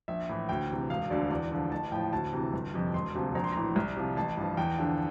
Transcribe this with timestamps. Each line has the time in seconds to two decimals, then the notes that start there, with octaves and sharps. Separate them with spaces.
0.08 A#1 E5
0.29 A2 E3
0.49 D2 G5
0.70 C3 E3
0.90 E1 F5
1.10 D2 D3 F3 D5
1.30 E2 D5
1.52 D3 F3
1.71 A1 A5
1.92 A2 F3 G5
2.13 D2 A5
2.33 C3 E3
2.53 G1
2.74 F2 C3
2.94 E1 C6
3.15 D2 C3 F3
3.35 A#1 A#5
3.44 C6
3.52 A2 E3 A#5
3.76 C2
3.96 C3 F3
4.16 A1 A5
4.37 G2 F3
4.57 E2 G5
4.78 D3 F3